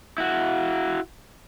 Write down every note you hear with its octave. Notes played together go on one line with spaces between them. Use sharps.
E4 F#4